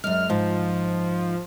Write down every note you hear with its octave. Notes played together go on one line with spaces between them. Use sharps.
F#2 G#3 F6
G#2 F3